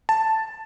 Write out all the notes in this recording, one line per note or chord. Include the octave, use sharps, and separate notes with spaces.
A5